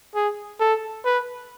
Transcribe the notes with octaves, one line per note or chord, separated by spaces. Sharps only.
G#4
A4
B4